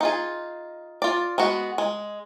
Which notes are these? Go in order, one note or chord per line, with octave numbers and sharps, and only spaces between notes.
D#4 F4 G#4
F4 D5
G#3 B3 F#4
G#3